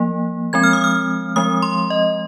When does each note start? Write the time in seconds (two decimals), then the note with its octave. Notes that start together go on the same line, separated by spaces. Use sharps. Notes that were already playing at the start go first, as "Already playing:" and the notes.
Already playing: F3 A#3
0.53 F3 G#3 C4 G#6
0.63 F6
0.73 D#6
0.84 F6
1.36 F3 G#3 C4 D#6
1.62 C6
1.90 D#5